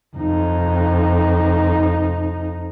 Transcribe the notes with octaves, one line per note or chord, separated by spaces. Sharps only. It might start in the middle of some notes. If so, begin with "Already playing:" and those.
F2 D#4